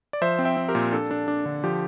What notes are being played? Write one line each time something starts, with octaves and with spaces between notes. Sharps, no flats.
D5
F3 C5 E5
C4
E5 G5
C4
G4 A#4
A#2
D4 A4
D4
D4
D3
F3 G4